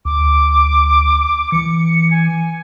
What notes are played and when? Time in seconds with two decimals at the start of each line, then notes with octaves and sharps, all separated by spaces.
0.05 D2 D6
1.52 E3 C#7
2.11 G#5